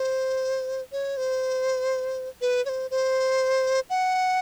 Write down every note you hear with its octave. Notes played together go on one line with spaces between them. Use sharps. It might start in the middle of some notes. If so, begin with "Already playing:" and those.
Already playing: C5
C#5
C5
B4
C#5
C5
C5
F#5